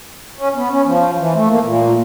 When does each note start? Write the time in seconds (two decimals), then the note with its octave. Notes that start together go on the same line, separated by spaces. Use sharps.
0.38 C#4
0.55 B3
0.72 C#4
0.86 F3
1.18 E3
1.34 A3
1.48 A#3
1.63 A#2